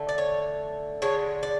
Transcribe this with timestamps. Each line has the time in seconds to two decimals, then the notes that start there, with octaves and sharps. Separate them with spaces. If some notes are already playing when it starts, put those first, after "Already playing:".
Already playing: D3 A3
0.09 D5
0.18 C#5
1.02 D3 G#3 C#5
1.43 D5